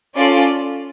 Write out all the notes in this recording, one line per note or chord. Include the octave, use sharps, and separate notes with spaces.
C#4 F4 A4 D5